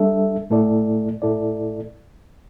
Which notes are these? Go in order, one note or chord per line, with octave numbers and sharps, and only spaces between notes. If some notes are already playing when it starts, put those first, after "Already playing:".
Already playing: G3 D4 A4 E5
A2 A3 E4 A4 D5
A2 A3 E4 A4 D5